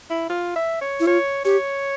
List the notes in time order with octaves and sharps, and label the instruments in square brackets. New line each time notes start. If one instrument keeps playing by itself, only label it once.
[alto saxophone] E4
F4
E5
C#5
[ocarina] E4
[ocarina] F4 [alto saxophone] C#5
[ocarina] G4 [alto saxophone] C#5